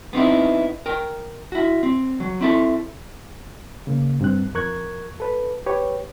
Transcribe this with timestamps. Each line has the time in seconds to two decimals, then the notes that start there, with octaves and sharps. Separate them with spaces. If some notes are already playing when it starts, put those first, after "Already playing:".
0.13 B3 C4 D#4 E4
0.86 A#4 G5
1.52 E4 F#4
1.83 C4
2.20 F#3
2.41 C4 E4 A4
3.87 C#3 A#3
4.21 G2 C4 F#6
4.54 F2 A#4 C#6 F#6 G#6
5.20 A4 B4
5.66 G4 B4 C#5